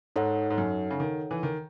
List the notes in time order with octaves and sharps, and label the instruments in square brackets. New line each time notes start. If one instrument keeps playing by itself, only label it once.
[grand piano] G#2 [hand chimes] D#4 A4 C#5 F#5
[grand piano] G#2
F#2
C#3
D#3
E3
D#3